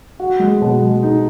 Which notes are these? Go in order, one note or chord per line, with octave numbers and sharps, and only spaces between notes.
F#4
G#3
B2
G#3
D#4